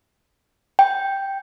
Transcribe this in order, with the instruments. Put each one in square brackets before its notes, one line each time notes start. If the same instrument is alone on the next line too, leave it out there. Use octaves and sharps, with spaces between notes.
[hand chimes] G5